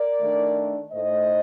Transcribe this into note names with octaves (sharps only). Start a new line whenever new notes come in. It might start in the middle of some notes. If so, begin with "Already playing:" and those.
Already playing: A#4 D5
D#3 A3 D4
A2 A3 D#4 C5 D#5